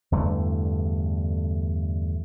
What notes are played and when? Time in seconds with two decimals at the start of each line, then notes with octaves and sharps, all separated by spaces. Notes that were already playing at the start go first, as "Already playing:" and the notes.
0.12 E2 G2 D3 A3